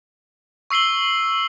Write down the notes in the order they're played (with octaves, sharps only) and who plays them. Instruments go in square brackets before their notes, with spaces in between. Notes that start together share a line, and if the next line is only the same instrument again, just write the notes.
[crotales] C#6 E6 C7 F#7 G7